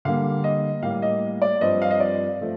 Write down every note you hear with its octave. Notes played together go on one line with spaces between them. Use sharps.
D3 G3 A#3 F5
D#5
A2 G3 A#3 F5
D#5
D5
G2 F3 C4 D#5
F5
D#5
D5
F3 A3